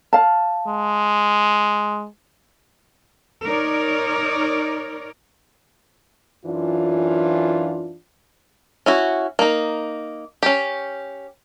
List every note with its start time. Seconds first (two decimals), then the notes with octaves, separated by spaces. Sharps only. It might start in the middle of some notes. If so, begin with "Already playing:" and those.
0.13 F5 A5
0.68 G#3
3.45 D#4 A#4 C#5 D5
6.46 F#2 E3 D4 F4
8.86 C#4 E4 F#4
9.39 A#3 D#4
10.43 C#4 G4